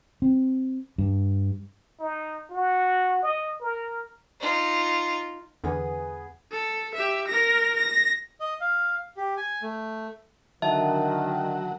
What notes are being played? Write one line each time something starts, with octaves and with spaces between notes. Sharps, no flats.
C4
G2
D#4
F#4
D#5
A#4
D#4 F4
E2 D3 B3 G#4 B4
A4
G4 E5
A#4 A#6
A#6
D#5
F5
G4
G#5
A3
D3 D#3 F#3 E5 A5